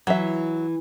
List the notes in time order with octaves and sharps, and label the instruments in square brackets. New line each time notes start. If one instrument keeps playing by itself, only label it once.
[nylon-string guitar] E3 [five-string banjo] F#3 E5